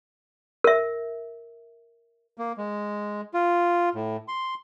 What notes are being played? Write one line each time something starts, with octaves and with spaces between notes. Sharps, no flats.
A#4 E5
A#3
G#3
F4
A2
C6